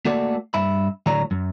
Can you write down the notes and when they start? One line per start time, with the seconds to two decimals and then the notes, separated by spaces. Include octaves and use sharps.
0.05 A3 A#3 F#4 A4 D5
0.54 G2 E5 B5
1.06 D2 A2 F#3 C#5 D5 A#5
1.31 F#2